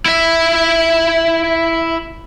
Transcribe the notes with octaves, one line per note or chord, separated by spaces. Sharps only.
E4 E5